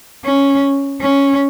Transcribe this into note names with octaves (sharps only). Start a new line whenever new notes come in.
C#4
C#4